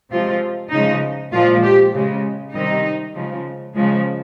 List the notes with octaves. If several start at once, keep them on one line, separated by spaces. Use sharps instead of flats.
C3 F3 G#3 F4
C#3 F3 G#3 D#4
A#2 F3 G#3 F4
G4
C#3 G#3
C3 D#3 G3 D#4
C#3 F3 G#3
C#3 F3 G#3